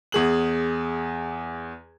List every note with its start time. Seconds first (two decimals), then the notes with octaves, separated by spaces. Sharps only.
0.12 E2 G#4 F#7